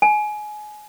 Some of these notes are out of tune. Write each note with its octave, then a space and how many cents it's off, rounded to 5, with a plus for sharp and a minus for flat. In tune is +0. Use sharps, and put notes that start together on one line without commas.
G#5 +25